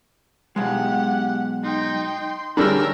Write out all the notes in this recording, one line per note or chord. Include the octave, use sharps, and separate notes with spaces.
B1 G#3 G4 F#5
D#4 G5 C6
D2 G3 D4 G#4 A#4 C#5 B5 E6